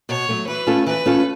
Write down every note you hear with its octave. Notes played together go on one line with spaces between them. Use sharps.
B2 C#5
F#3 A3
E3 B4
A3 C#4 F4 A4
E3 B4
A3 C#4 F4 A4